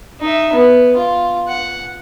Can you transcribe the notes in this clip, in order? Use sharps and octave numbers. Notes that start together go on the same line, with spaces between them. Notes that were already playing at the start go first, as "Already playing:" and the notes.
D#4 E5
B3
F4
F#5